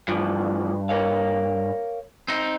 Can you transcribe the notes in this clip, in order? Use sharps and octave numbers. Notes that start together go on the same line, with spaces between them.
D2 G2 E3 F3
A#4 C#5 F5
C4 D#4